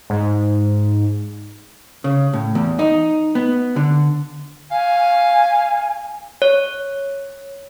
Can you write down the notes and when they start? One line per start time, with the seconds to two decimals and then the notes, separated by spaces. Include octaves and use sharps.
0.10 G#2
2.04 C#3
2.33 A2
2.55 E2
2.79 D#4
3.35 B3
3.76 D3
4.71 F5 G#5
6.42 C#5